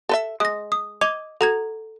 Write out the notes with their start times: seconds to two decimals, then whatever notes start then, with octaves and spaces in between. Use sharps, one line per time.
0.09 A4 B4 E5
0.40 G#3 D#6 A#6
0.72 D#6
1.01 D#5 D6 G#6 F7
1.41 F#4 A4 A#5 G#6